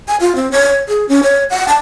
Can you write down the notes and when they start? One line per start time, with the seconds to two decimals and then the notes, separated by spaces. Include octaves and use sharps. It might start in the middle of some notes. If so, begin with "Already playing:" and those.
0.08 G#5
0.20 F4
0.35 C4
0.52 C#5
0.88 G#4
1.09 C#4
1.23 C#5
1.50 F#5
1.68 A5